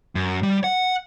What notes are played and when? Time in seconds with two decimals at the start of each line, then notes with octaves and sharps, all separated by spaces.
0.15 F#2
0.43 G3
0.64 F#5